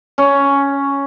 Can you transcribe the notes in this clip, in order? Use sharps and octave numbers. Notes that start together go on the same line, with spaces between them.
C#4